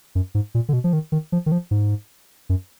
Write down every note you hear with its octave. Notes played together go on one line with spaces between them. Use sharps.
F#2
G#2
A#2
D3
B2
F3
D#3
D#3
F3
D#3
F3
G#2
F#2